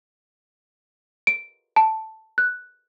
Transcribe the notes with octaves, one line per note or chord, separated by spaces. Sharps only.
D7
A5
F#6